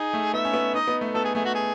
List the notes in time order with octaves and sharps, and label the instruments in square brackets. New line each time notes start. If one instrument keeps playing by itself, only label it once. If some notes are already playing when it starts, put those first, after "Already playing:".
Already playing: [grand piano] D#4 [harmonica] G#4
[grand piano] A3
[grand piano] B3 [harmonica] E5
[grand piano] C#4
B3
[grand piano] D#4 [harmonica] D#5
[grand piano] B3
A3
[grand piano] B3 [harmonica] A4
[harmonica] G#4
[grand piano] A3 [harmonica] G#4
[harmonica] F#4
G#4